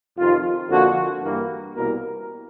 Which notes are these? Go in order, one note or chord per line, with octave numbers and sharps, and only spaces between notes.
F2 C3 D#3 F4
F2 D3 F3 A#3 F#4
G2 E3 G3 A#3
C2 B2 G3 A#3 A#4